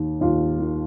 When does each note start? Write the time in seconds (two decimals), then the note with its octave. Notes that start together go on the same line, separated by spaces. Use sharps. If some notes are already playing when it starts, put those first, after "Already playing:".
Already playing: D#2 D#3
0.21 D#2 F4
0.59 D#3